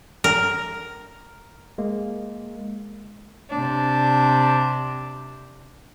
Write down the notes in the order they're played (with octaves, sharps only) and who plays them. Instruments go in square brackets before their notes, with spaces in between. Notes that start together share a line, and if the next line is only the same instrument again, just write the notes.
[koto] A#4
[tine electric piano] G#3 A#3
[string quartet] C3 D4